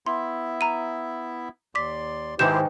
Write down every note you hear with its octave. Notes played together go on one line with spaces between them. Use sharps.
B3 E4 E5 C6
A#5 D#7
D#2 D5 C6 D6 B6
G#2 D#3 E4 G4 B4 C5 G6 E7